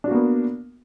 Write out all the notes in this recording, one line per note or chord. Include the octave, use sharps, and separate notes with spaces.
A#3 B3 D4 F#4